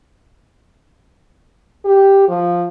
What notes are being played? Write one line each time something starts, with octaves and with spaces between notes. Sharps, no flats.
G4
F3